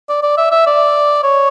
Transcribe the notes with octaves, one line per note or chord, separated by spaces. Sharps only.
D5
D5
E5
E5
D5
C#5